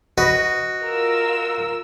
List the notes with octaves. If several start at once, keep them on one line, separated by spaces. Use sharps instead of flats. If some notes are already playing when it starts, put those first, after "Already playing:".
F#4 B4 D#5
F4 A#4 E6